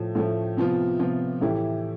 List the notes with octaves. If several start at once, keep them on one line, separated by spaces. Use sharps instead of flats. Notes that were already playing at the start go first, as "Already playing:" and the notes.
Already playing: A2 F3 A3
A2 F3 A3
C3 F3 B3 F4
C3 F3 B3 F4
A2 E3 A3 E4 G4